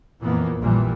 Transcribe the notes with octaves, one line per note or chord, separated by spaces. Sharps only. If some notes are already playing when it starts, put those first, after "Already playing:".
F2 A#2 E3 A#3 B3
A#1 A#2 E3 G3